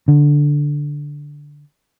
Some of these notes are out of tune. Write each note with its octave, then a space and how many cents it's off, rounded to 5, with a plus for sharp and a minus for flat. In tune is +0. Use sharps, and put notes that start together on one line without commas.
D3 -5